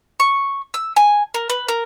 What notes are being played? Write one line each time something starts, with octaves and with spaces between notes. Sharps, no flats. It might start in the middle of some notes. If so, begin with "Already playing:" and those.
C#6
E6
G#5
A#4
B4
A#4